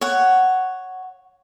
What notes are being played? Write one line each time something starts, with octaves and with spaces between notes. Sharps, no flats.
C#5 F#5